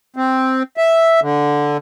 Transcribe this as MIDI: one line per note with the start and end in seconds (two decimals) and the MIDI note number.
0.16 0.63 60
0.77 1.20 76
1.22 1.77 50